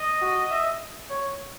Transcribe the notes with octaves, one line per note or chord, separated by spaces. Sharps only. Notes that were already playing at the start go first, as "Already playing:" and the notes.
Already playing: D#5
F#4
E5
C#5